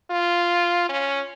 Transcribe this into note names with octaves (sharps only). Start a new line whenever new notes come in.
F4
C#4